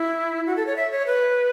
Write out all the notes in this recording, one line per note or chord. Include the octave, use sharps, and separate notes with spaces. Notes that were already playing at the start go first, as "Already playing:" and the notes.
Already playing: E4
F#4
A4
C#5
E5
C#5
B4